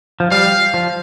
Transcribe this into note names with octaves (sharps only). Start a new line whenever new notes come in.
F3
G3 F5
F3